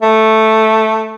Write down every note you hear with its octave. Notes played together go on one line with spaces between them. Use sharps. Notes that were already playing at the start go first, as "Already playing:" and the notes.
A3